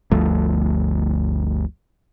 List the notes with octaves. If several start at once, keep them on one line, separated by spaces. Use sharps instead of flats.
G1 D2 F3 A3